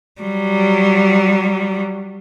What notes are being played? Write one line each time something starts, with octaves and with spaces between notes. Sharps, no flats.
F#3 G3